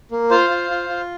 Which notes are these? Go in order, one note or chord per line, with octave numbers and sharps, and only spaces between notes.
A#3
F4 C5 F5
F4
F4
F4